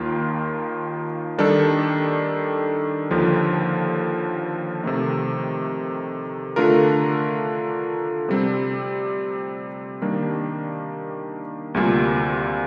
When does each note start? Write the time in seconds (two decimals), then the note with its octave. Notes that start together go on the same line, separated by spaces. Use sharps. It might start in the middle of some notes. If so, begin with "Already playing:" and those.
Already playing: D#2 D#3 A#3 F4
1.38 D#3 G3 D4 A4
3.11 D#2 D3 F3
4.84 C3 D#3 A3 D#4
6.56 D3 A3 D4 F4 A#4
8.29 C3 G3 C4
10.02 D#3 G3 A#3 D4
11.74 D2 C3 G3 A#3 F4